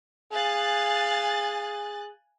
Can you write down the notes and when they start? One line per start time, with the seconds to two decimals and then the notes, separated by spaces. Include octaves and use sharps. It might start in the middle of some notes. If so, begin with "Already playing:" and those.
0.33 G#4 F5 G#5 F#6 A6